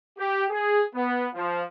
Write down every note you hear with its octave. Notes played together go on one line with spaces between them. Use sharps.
G4
G#4
B3
F3